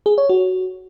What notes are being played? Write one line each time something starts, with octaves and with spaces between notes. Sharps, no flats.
G#4
C#5
F#4